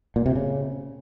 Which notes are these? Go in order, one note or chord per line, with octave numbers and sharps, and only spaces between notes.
A#2
C3
C#3